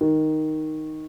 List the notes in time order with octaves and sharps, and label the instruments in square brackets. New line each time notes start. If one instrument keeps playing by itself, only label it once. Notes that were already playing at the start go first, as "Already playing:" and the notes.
[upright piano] D#3